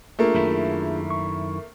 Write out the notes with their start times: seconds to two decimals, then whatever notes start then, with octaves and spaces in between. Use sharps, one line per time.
0.19 A3 A#3 D4 F4 G#4
0.35 F#2 D#3 E4
1.10 C#6